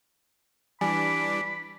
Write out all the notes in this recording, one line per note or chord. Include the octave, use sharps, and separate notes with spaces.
E3 G3 D4 G#5 B5 D6